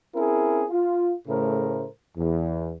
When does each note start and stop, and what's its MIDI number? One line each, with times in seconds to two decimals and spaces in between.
0.15 0.64 60
0.15 0.64 61
0.15 0.64 64
0.15 0.64 68
0.15 0.64 70
0.70 1.13 65
1.27 1.86 45
1.27 1.86 49
1.27 1.86 57
1.27 1.86 70
1.27 1.86 72
2.18 2.74 40